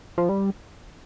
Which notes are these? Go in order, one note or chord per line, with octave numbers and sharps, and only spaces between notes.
F3
G3